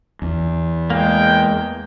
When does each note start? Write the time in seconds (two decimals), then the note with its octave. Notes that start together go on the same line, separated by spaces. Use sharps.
0.22 E2
0.90 G#3 A#3 G5